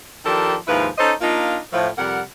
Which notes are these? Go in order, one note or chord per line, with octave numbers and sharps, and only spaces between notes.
D#3 F3 D4 G4 A4 A#4
D#2 G#2 F3 E4 B4
C#4 D#4 A4 C5 C#5 D#5
A#3 D4 D#4 F4
A2 F3
F2 C3 G3 A#4 F#5